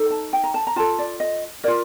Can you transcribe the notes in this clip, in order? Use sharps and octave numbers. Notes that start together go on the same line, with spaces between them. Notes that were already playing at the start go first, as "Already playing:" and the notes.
Already playing: D#4 A4
A5
G5
A#5
A5
A#5
F4 A4 A5
D5
D#5
F4 A#4 D5